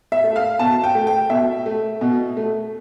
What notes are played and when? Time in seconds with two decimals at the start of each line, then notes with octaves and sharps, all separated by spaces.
0.12 E5
0.24 A3
0.36 F5
0.59 B2 A5
0.84 G5
0.95 A3
1.07 G5
1.30 B2 E5
1.66 A3
2.01 B2
2.37 A3